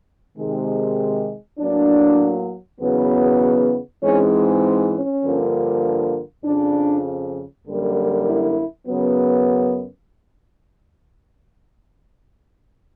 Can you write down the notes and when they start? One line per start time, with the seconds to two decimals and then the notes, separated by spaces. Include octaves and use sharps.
0.38 C3 D#3 G#3
1.59 A2 F#3 A#3 D4
2.81 E2 C#3 F#3 B3
4.02 G#2 E3 G#3 C4 C#4
4.93 C#4
5.24 G2 D3 F3 A#3
6.45 F2 C#3 F3 D4
7.66 F#2 D3 G3 A#3
8.27 E4
8.88 F#2 C#3 F#3 B3